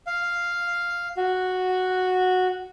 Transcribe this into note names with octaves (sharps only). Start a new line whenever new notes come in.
F5
F#4